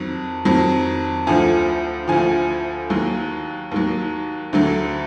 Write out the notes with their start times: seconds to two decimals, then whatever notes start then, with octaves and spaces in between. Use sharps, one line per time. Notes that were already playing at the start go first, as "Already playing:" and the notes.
Already playing: F2 D#3 F#3
0.45 F2 D#3 F#3
1.27 D2 D3 F3 G#5
2.08 D2 D3 F3 G#5
2.90 D#2 D#3 F#3
3.72 D#2 D#3 F#3
4.53 D2 D3 F#3